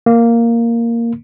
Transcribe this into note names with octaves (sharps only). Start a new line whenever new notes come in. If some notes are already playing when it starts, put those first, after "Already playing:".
A#3